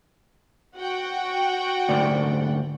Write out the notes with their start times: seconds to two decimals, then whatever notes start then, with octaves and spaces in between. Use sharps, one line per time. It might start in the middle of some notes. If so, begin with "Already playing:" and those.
0.77 F#4 F#5 G5
1.89 D2 G#2 D5